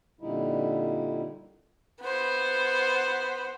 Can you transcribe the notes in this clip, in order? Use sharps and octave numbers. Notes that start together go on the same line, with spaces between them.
F2 A#2 D3 G3 D#4 E4
B3 C5